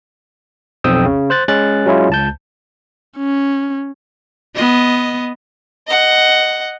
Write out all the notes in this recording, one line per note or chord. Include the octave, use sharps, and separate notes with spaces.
B1 F2 C4 G5 D#6 E6
C#3
C5 F#6 A6
G#3 C#4 F#6 A6
F#3 G#3 C#4 E4 F4
C#2 A5 G6
C#4
B3 D#5
D#5 F#5